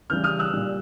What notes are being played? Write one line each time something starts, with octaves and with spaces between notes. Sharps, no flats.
C#3 E3 G3 F6 G6
D#6 F6
E6 F#6
A#2 G3